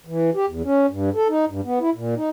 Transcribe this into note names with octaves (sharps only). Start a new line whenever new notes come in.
E3
G4
E2
C#4
G2
A4
D#4
G2
B3
E4
A#2
D#4